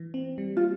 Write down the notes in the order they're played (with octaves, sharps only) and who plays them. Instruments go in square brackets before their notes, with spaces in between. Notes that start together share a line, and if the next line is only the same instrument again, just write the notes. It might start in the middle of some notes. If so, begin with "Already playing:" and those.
Already playing: [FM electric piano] E3
C4
G3
[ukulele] F4